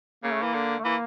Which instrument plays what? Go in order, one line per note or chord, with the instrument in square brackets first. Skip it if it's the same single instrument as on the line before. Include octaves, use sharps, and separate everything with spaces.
[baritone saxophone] C#3 [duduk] A#3
[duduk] A3
[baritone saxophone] E3 [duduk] A#3
[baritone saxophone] D3
[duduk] A3
[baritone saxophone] E3 [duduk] A#3